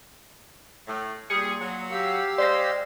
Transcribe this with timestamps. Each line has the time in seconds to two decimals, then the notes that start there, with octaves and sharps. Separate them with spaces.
0.88 A2
1.30 A#2 G3 G#4 C#7
1.61 F#3
1.91 G4 F5 E6
2.38 G#3 C5 D5 A#6